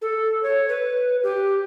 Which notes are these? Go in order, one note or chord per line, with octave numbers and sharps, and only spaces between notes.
A4
C#5
B4
G4